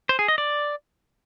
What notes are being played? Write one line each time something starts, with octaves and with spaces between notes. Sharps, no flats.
C5
G#4
D#5
D5